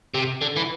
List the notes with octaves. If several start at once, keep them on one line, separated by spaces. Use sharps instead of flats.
C3
D3
E3